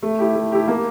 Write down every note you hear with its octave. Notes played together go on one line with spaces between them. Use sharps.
A3
E4 G4
A3
E4 G4
A#3